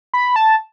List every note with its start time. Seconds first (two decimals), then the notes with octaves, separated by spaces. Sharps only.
0.14 B5
0.36 A5